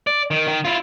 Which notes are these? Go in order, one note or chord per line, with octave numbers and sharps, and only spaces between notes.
D5
D#3
D#3
E4 F4